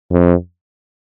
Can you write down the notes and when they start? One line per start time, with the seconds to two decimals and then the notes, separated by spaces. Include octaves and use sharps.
0.12 F2